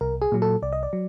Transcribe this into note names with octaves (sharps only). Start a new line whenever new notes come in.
C2 A#4
G#4
A#2 F#3
A4
C2 D5
D#5
D5
F#3